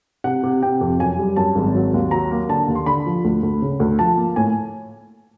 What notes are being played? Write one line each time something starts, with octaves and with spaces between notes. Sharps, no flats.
C3 F#5
C3
C3 G5
F2
F#2 G#5
G3
F#2 A5
G#1
F#3
D#2
F#3 A#5
A#3
D3 A5
D#2
C6
D3 B5
F3
D2
D2
C#3
D2
F3 A5
A#3
A2 G#5